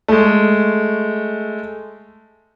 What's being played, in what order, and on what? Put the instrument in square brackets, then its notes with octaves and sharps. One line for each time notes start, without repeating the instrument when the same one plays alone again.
[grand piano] G#3 A3